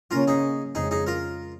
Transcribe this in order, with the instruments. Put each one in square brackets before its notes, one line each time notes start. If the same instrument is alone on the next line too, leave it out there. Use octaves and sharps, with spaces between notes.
[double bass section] C#3 A#3 C#4 [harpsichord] F4 A#4
[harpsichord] D#4 G#4
[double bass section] F2 C#3 G#3 [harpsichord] D#4 G#4
[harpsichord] D#4 G#4
F4 A#4